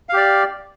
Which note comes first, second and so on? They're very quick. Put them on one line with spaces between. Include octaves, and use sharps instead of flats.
F5 G4 D5